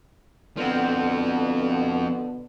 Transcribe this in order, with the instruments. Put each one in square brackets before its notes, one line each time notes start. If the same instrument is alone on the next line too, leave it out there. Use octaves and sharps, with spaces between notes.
[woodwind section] B2 D3 B3 [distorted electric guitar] F3 C4